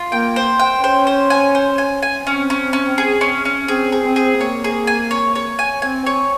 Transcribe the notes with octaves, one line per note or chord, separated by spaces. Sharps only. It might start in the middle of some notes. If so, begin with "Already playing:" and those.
Already playing: F4
A#3 G5
C5
G5
C#4 C5
C5
G#5
C5
G#5
G#5
C4 C#4
C#4
C#4
G#4
C#4
C#4
C4 G#4
G#4
C4
G#4
A#3 C#5
G#4
G#5
C#5
C#5
G#5
C4 G#5
C#5